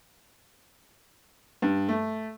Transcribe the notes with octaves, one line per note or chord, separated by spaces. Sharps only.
G2
A3